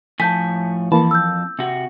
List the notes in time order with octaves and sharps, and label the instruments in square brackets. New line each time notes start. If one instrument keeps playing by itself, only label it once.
[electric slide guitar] A2 F3 G#5 [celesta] A5 G6 B6
[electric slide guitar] F2 A5 [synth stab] E3 A#3 [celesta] B5
[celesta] E6 G6
[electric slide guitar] C3 F#4